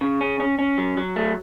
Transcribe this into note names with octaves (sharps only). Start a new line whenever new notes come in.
C#3
C#4
C#4
C#4
F#3
F#3
A3